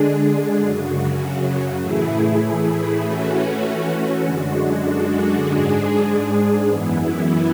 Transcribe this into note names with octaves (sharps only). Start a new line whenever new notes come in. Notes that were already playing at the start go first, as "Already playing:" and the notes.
Already playing: D3 G#3 D4 G#4
F#2 C#3 F#3
A2 E3 A3 E4 G#4
E3 A3 C#4 F#4
F#2 D3 G#3 D4 F#4
G#2 G#3 D4 G#4
F#2 E3 B3 E4